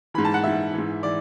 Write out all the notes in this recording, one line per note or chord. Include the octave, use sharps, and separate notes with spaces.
G#2 E3 B5
A5
F#5
G#2 E3 E5
E3
G#2
E3 D5